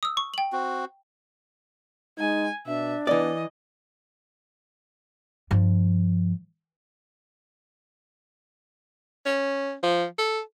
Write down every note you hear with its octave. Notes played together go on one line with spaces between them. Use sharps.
D#6 E6
C#6
G5 F#7
C4 F#4
G#3 D#4 G#5
B2 D4 E5
E3 B3 D5 D#5
G2 F3
C#4
F3
A4